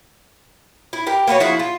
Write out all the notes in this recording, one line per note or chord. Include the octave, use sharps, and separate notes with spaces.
E4
G4 A#4
A#3 B3 F#4 C#5
F3 E4 F#4 G#4
F4